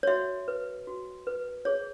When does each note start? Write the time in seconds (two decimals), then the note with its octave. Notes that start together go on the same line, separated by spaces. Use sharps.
0.03 C#5
0.07 F#4 E5
0.48 B4
0.87 F#4
1.27 B4
1.65 G#4 C#5